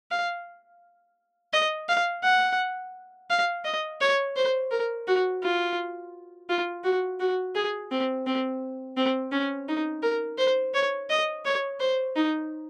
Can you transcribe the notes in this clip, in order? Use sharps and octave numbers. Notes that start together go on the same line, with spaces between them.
F5
D#5
F5
F#5
F5
D#5
C#5
C5
A#4
F#4
F4
F4
F#4
F#4
G#4
C4
C4
C4
C#4
D#4
A#4
C5
C#5
D#5
C#5
C5
D#4